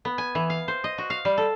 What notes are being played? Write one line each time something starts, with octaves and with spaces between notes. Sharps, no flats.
B3
G#5
E3
F5
C5
D#5
F#4
F5
G3
A4